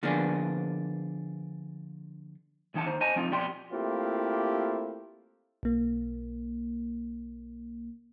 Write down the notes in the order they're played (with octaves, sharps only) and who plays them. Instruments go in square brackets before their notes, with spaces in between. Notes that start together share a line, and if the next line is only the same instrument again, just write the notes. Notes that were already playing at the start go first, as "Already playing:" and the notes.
[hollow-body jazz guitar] D3 F3 A#3 B3 D4 G#4
[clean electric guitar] D#2 E3 D#4 F#5 A5
D#2 D#4 C5
C5 D#5 G#5 A5
F3 C4 D#4 F4
F2 B2 G4 D5 G5 C6
[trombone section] A3 A#3 C4 E4 F4 G4
[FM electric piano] B1 A#3